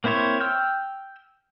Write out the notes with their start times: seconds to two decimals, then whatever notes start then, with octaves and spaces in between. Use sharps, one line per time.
0.04 A#3 C4 E4 C5 C#5
0.41 G5 E6 F6 G6